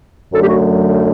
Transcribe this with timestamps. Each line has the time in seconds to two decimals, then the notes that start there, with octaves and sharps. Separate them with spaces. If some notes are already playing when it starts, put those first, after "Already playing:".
0.33 F#2 D3 F#3 A3 A4
0.41 G4
0.49 F#4